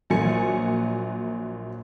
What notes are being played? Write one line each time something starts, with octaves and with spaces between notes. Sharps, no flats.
A#1 A#2 F#3 G#5 C#7